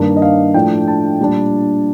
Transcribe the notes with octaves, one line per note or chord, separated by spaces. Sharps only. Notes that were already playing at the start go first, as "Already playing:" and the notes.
Already playing: G2 D#3 A#3 D4
D#5
F5
A2 F3 A3 D4 G5
A5
A#2 G3 D4